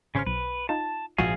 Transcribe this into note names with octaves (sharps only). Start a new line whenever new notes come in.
G#1 C#3 C#4 C5 F6
B1 B4
D#4 F4 A5
A#1 G#2 F3 F#4 G#4 E5 F5 G#5